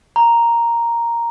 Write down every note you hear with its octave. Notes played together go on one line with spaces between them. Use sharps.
A#5